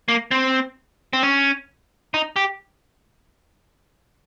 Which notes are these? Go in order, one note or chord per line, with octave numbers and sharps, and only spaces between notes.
A#3
C4
C4
C#4
D#4
G4